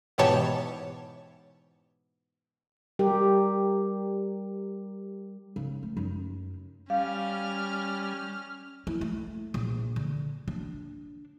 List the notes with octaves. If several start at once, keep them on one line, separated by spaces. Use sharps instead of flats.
G#2 B2 E3 G4 C#5 A5
G3 G4 A#4
C#3
A3
F#2
G3 C#4 F5 F6
E4
A3
A#1
D3
D4